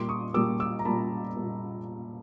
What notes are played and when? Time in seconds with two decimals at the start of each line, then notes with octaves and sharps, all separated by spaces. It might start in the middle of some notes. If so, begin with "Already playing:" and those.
Already playing: A#2 G3 A#3 C6 D6
0.09 C#6 D#6
0.34 A#2 G3 A#3 D6 E6
0.60 D6 E6
0.79 A#5
0.85 A#2 G3 A#3 A5 B5
1.36 A#2 G3 A#3